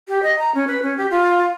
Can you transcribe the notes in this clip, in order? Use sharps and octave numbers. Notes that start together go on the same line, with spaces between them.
G4
D#5
A#5
C#4
B4
C#4
G4
F4